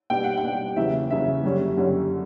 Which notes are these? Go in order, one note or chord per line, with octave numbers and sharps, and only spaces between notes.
B2 G3 D4 G5
F#5
G5
B2 G3 D4
E2 C#3 F#3 E5
E2 C#3 F#3 E5
F#2 D3 G3 C#4
F#2 D3 G3 C#4